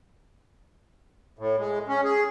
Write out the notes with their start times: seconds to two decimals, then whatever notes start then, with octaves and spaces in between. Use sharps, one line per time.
1.39 A2
1.59 G#3
1.89 C#4
2.04 G#4